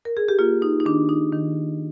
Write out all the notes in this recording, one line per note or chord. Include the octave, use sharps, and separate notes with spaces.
A#4
G#4
G4
A#3 F4
D#4
D#4
D#3 D4
D#4
D#3